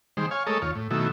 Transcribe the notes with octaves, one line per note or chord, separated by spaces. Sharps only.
D#3 G3 G#3 C5
C#5 F5 G#5
G#3 A3 A4 A#4 C#5 D#5
D#2 F4 C#5
A2
B2 D#3 F#3 A3 E4